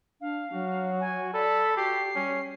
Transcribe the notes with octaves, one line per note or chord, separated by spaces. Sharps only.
D4 F5
F#3 F#4
G#5
A4 D5 B5
F#4 G4 C7
G3 C#4